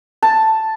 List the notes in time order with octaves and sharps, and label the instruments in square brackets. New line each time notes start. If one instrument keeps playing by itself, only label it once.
[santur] A5